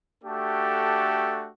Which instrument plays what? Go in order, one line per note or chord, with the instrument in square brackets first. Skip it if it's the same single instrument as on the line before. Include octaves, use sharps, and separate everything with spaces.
[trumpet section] A3 D4 F#4 G4 A4